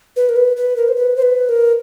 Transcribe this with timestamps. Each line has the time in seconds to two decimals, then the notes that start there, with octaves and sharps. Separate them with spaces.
0.16 B4
0.29 A#4
0.36 B4
0.57 B4
0.76 A#4
0.88 C5
0.96 B4
1.16 C5
1.22 B4
1.49 A#4